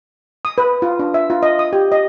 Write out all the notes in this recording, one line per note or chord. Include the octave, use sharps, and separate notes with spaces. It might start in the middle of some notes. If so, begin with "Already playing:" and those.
D#6
B4
F4
D4
E5
F4
D#5
D#6
G4
D#5